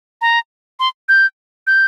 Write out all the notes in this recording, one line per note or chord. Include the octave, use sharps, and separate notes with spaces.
A#5
C6
G6
G6